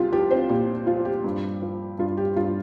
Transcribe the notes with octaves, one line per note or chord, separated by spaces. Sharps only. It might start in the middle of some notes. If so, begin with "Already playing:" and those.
Already playing: C2 F4 G4
F3 G4
C4 C5
A#2 G4
F3 F4
G4
G2
F3
G2 F4
G4
G2 F4